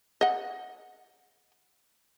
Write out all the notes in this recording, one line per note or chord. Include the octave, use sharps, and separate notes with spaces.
D#5 F#5